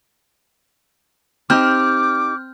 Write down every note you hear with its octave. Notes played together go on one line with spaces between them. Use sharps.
C4 D#4 G4 D6 F6 G6